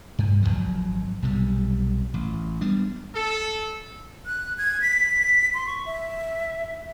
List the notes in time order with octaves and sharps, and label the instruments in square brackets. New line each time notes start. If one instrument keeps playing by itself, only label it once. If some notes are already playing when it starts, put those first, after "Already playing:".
[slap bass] G2
G#1 F2 F3 F#3
B1 C3 G3
A1
G3 B3 D4
[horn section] A4
[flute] F#6
G#6
B6
C6
C#6
E5